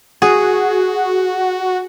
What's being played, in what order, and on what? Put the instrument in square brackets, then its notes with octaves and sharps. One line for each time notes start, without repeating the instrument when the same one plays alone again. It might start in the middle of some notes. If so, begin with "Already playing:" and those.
[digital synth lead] F#4 [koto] G#4